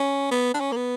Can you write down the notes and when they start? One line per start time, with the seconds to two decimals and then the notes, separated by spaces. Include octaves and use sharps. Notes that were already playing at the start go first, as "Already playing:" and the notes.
Already playing: C#4
0.31 B3
0.54 D4
0.60 C#4
0.72 A#3
0.76 B3